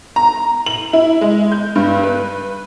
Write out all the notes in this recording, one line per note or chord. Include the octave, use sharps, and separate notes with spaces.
A#5
F#7
E4
G#3
G6
G2
B4